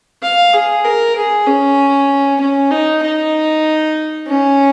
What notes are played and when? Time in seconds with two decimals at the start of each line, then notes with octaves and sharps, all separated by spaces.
0.22 F5
0.54 G#4
0.85 A#4
1.16 G#4
1.47 C#4
2.41 C#4
2.71 D#4
3.03 D#4
4.27 C#4